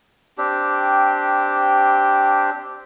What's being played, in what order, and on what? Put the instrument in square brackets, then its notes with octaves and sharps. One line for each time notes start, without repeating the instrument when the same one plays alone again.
[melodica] C4 D4 G4